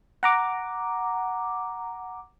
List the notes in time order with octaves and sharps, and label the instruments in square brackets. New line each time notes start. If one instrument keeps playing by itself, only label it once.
[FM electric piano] F#5 A#5 D6